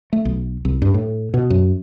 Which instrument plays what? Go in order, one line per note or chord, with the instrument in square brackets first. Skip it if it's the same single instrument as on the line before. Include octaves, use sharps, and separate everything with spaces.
[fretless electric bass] A3
B1
C2
G2
A2
B2
F#2